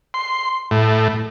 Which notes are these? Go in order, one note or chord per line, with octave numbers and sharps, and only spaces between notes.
C6
A2